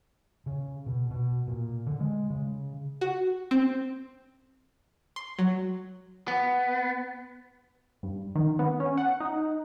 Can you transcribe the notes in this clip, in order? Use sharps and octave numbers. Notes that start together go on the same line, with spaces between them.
C#3
B2
B2
A#2
D3
G#3
C#3
F#4
C4
C6
F#3
B3
G2
D#3
B3
C#4
F#5
D#4